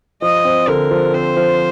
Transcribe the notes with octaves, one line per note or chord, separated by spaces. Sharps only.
F3 D#5
C4
D3 A#4
F3
C4 C5
F3